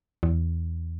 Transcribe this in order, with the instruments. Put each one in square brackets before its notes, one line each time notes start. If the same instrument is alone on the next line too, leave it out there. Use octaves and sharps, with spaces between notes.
[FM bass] E2